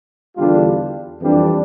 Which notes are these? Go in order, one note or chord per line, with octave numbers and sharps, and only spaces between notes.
E2 D3 G3 D4 F4
F2 E3 G3 D4